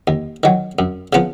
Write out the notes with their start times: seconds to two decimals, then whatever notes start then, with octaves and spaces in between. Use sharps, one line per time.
0.08 D#2
0.43 D#3 F#3
0.79 F#2
1.13 C#3 F3 B3 F4